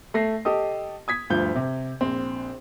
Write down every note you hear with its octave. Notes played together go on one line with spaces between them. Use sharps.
A3 A4 A#6 C7
G4 A4 D#5 D#6
D#6 G#6 B6
D2 G2 F3 G6
C3
A#1 C4